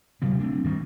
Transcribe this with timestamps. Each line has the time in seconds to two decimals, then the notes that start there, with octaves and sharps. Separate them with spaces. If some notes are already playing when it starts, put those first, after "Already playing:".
0.22 C3 F#3 G3 B3
0.39 A3 A#3 C4 D4
0.64 G2 D#3 G3